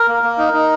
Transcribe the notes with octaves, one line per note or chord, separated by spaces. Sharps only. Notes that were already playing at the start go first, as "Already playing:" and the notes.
Already playing: A#4
A#3
A#3
D#4
D#4